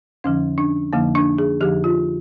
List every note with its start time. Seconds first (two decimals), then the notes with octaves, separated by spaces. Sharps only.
0.24 F2 D3 F3 C#4
0.58 D4
0.93 F2 D3 F3 A#3
1.15 D4
1.39 G#4
1.61 F2 D3 F3 G4
1.84 F4